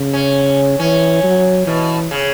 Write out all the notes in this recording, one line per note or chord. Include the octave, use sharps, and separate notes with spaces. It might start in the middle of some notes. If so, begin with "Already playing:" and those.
Already playing: C#3
C#4
E3 C#4
F#3
B2 E3
C#3